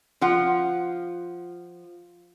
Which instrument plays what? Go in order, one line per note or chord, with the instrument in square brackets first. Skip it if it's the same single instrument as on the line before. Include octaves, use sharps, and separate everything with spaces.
[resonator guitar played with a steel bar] F3 F4 F#5